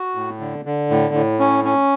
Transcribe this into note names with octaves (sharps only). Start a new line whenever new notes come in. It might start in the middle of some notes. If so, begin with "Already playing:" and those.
Already playing: F#4
A2
D3
D3
A2
A2
C#4
C#4